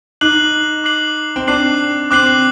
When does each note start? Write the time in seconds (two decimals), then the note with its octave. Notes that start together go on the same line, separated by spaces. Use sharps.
0.21 D#4 D6 F#6 C7 F#7
0.84 D6 F#6 C7 F#7
1.36 C4
1.47 D4 D6 F#6 C7 F#7
2.11 C4 D6 F#6 C7 F#7